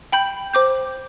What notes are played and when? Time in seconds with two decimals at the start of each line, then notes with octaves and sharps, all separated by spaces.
0.12 G5 B5 G6
0.53 C5 D6 G6